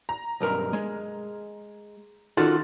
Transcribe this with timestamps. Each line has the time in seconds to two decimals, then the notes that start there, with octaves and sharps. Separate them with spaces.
0.09 A#5
0.41 B1 G2 A#4
0.73 G#3
2.37 D#3 F4 F#4 A4 C6 A6